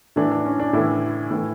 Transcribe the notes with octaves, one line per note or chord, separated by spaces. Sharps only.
A2 E3 D4
D4
C#4
D4
A2 E3 E4
A2 E3